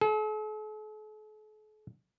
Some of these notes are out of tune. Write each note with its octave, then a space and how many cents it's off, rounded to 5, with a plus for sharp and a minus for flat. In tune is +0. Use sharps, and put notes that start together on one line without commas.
A4 -45